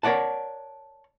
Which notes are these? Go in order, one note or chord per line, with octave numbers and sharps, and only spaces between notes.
A#4 C#5 D5 F#5 A5